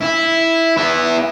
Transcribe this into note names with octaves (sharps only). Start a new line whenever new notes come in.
E4
B3 E4